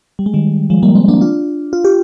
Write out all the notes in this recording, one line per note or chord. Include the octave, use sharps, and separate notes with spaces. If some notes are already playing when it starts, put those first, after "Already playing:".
G3
G#3
D#3 G3
F3 G#3
G3 A#3
G#3 C4
A#3 D4
D4 F4
F4
G4